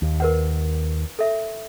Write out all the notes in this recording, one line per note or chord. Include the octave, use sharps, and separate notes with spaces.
D#2
A#4 B4 F#5
A4 E5